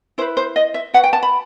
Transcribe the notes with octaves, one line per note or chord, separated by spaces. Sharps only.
E4 B4 C5
C5
D#5
E5
F#4 B4 F#5
G5
A5
B5